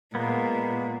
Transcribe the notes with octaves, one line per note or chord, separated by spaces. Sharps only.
A#2 G#3 A#3 B3